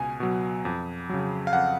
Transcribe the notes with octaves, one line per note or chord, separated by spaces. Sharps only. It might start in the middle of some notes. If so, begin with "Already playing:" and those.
Already playing: C#2 B2 G#5
B2 F#3
F2
C#3 F#3
F5
F2 F#5